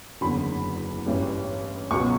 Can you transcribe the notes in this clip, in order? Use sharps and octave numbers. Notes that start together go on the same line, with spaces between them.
F#1 E2 D3 F#3 B5
A1 G2 E3 G3
C#2 B2 F#3 C#6